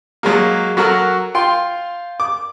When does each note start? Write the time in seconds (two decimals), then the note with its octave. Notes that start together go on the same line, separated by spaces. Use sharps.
0.23 F#3 G#3 A#3
0.77 F#3 F#4 A4 A#4
1.35 F4 G5 C6
2.20 D6